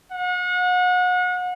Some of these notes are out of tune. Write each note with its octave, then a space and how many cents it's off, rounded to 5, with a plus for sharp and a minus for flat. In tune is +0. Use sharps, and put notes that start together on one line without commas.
F#5 -35